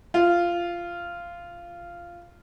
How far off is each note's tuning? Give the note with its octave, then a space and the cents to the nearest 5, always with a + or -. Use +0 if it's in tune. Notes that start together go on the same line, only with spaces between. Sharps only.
F4 -10